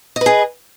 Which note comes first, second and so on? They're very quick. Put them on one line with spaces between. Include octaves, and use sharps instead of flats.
D#5 B4 G#4